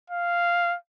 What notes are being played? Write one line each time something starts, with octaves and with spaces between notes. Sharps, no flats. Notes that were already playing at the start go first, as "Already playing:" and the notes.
F5